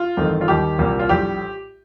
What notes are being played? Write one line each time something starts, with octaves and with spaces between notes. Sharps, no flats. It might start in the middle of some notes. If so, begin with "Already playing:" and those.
Already playing: F4
A1 G2 D#3 A3 C4
F4
D#2 D#3 G3 G4
C2 A#2 G3 A#3
F4
A#1 A2 G3 G4